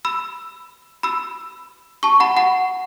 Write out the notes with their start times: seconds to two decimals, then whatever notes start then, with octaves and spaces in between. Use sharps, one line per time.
0.05 B5 E6
1.03 B5 E6
2.03 A5 C#6
2.20 F#5 B5
2.37 F#5 B5